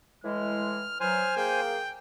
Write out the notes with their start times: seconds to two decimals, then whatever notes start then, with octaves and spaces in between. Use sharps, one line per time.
0.24 A2 E3 G#3 F6
1.00 E3 F#3 C5 G#5 F6
1.37 A#3 G#4 G5